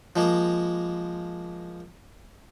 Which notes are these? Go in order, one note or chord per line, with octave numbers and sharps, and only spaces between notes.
F3 G#3 A#3